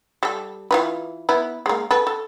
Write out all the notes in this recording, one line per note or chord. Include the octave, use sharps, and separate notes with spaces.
G3 A4
E3 F4 B4
B3 E4
G#3 A#3
A4 B4
A4